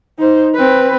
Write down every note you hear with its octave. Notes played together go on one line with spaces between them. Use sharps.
D#4 C5
C4 B4